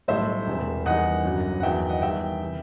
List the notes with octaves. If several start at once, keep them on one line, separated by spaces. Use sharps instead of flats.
B1 A2 G3 C5 E5
E1 E2 C3
E2 D#3 G3 D#5 F#5
G1 F#2 F#3
F#5
E2 D#3 F#3 E5 G5
D#5 F#5
E2 D#3 G3 E5 G5
C3 E3